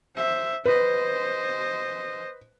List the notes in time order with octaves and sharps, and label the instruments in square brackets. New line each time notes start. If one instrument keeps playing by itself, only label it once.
[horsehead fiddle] C5 E5
[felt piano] B4 [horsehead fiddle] C5 D#5